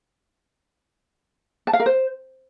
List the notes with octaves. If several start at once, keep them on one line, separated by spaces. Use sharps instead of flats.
A5
F5
A#4
C5